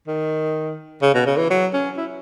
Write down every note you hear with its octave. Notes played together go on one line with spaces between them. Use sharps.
D#3
C#3
B2
C#3
E3
F#3
C#4
E4